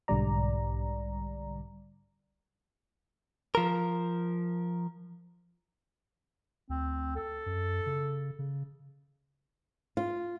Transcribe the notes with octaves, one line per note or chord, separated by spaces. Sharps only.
B1 G#2 D3 G3 D5 A#5
F3 A#4
D2 C4
A4
F#2
C#3
C#3
F4